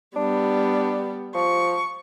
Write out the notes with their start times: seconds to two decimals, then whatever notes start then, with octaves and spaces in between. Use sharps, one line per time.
0.16 G3 B3 D4
1.35 F3 C#6